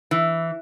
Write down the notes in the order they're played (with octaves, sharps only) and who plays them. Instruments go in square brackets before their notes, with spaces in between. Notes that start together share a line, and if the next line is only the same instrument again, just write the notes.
[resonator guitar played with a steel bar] E3